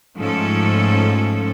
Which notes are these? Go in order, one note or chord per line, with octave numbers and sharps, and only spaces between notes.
G#2 F3 A3 C#4 A4